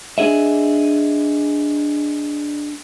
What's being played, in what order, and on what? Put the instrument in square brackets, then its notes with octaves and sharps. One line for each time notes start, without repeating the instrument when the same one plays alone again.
[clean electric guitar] D4 G#4 D#5 E5